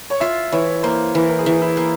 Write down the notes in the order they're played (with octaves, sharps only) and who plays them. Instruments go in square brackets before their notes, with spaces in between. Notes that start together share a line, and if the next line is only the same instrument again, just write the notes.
[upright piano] C#5
[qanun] F4 [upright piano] E5
[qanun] E3 [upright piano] C#5
[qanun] A#3 [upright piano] C5
[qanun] E3 [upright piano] A#4
[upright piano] A#4
G#4
[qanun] E3
[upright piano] E4
[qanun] A#3